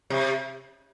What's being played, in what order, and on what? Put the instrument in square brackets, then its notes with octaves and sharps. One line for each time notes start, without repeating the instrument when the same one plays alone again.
[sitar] C3